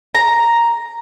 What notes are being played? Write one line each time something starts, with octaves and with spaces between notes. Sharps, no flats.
A#5